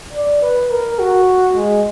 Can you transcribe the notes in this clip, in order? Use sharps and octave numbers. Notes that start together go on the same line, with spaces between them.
D5
B4
A#4
F#4
G#3